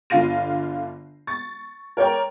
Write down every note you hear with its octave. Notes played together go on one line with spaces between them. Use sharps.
G1 D3 F4 F5 A#6 D#7
C#6 A6
A#4 C#5 D5 G5 A#5